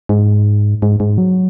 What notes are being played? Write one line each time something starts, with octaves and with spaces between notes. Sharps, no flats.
G#2
G#2
G#2
F#3